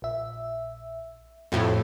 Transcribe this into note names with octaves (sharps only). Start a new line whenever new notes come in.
A#1 E5
F2 A2 F#4